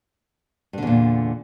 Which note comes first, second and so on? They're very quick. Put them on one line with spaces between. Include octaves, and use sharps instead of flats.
G2 D3 E2 A#2